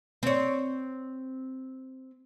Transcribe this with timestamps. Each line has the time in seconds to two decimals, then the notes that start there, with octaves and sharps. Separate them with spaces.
0.23 C4 C#5